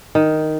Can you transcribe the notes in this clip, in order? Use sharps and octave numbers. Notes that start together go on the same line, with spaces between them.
D#3